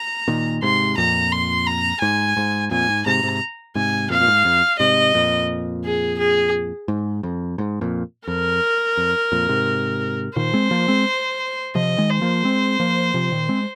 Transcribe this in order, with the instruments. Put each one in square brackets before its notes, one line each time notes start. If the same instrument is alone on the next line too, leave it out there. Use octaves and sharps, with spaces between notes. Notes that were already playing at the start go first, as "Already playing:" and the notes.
Already playing: [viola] A#5
[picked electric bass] A#2 D#3
[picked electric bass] G#2 C3 [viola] C6
[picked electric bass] F2 A#2 [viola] A#5
[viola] C6
A#5
[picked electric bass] G#2 [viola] G#5
[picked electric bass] G#2
[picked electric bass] F2 A#2 [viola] G#5
[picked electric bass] G#2
[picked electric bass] G#2 C3 [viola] A#5
[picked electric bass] G#2 C3
[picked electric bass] G#2 C3 [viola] G#5
[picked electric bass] F2 A#2 [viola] F5
[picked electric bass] A#2
G#2
F2
[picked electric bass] G#2 C3 [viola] D#5
[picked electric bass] F2 A#2
[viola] G#4
G#4
[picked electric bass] G#2
F2
G#2
F2 A#2
[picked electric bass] F2 [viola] A#4
[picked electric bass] F2
F2 A#2
G#2 C3
[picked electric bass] A#2 D#3 [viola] C5
[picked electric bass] G#3 C4
F3 A#3
G#3 C4
[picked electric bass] C3 F3 [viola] D#5
[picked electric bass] D#3 G#3
[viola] C5
[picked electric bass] F3 A#3
G#3 C4
F3 A#3
C3 F3
A#2 D#3
G#3 C4